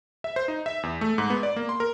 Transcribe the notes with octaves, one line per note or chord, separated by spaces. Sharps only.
E5
C5
D#4
E5
E2
A3
G#2
B3
D5
A#3
C6
A#4